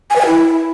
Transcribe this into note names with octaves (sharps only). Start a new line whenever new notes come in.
G#5
B4
G#5
E4